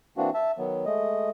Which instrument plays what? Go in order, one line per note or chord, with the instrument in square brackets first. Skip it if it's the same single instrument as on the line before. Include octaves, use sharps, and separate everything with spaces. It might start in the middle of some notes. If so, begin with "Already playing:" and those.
[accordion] E3 A#3 C4 D4 F#4
E5 A5
D#3 F#3 B3
G#3 A3 D#5